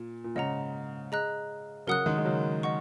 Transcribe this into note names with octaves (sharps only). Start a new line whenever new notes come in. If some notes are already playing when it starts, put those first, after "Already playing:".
Already playing: A#2
A#2
G#2 C#3 D#5 F#5 A#5
G#4 D#5 A#5 F#6
C#3 F#3 A#4 F#5 D#6 F#6
D#3 G#3
G#3
C#3 F#3
D#5 F#5 C#6